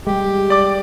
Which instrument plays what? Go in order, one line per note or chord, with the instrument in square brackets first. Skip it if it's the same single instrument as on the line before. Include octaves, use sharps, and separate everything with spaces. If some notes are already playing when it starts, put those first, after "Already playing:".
[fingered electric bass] G3 G#3 [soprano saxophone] G4
[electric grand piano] D5 D6